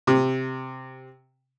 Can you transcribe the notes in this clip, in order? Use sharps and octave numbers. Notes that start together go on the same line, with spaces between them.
C3